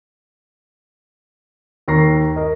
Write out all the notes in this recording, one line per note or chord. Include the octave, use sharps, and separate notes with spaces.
D#2 A#4 A#5 C#6 A#6 C7
A#4 D#5